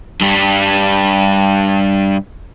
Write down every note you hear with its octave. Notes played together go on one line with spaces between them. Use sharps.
G2 G3